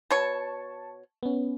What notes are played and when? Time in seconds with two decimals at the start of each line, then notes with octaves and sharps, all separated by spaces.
0.10 B2 C#5 A5 C#6
1.23 B3 C#4